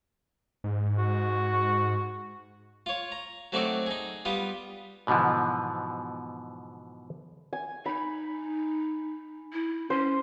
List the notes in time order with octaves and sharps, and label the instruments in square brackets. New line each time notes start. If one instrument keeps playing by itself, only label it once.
[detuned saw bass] G#2
[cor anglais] F#4
[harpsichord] F4 C#5
A#5
F#3 A3 C4 D#4 F#4 D5
D#4 G#4
G3 B3 F4 D#6
[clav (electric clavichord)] G#2 B2 D3 E3 F3
[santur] G#5
[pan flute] D#4 [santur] B5
[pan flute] E4
[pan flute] C#4 [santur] C5